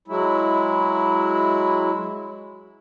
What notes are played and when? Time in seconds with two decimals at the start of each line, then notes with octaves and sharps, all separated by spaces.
0.08 F#3 G#3 E4